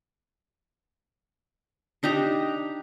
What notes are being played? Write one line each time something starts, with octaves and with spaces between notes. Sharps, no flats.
D4 D#4 G4 A#5